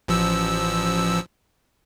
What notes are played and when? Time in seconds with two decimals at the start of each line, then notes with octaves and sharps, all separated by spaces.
0.08 A1 F3 E6